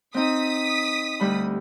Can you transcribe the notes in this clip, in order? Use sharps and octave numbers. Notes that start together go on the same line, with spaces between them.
C4 D#4 D#6 B6
D2 G3 B5